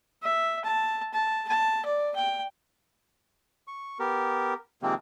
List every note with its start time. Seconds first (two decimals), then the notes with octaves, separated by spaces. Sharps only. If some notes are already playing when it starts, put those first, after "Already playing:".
0.22 E5
0.65 A5
1.14 A5
1.49 A5
1.86 D5
2.16 G5
3.67 C#6
4.00 B3 G4 A#4
4.82 C3 D#3 F3 G#3 A#3 C4